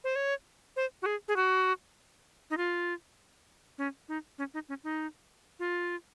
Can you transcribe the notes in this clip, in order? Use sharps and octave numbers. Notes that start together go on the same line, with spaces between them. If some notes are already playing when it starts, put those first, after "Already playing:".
C5
C#5
C5
F#4
G#4
G#4
F#4
D#4
F4
C#4
D#4
C#4
D#4
C#4
D#4
F4